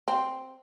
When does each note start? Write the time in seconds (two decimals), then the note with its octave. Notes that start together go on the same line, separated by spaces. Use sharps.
0.08 C4